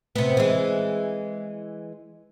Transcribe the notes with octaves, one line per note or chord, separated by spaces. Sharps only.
C3 B3
E3 G#3